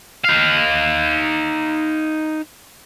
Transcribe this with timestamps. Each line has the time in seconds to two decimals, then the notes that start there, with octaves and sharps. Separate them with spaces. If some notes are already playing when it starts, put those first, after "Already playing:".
0.25 D#4 F5